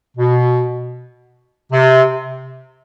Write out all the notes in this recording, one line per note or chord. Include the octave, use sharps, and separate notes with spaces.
B2
C3